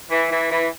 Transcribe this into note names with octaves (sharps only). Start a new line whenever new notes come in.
E3
E3
E3